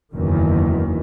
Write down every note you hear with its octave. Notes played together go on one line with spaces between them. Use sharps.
F#1 E2 D#3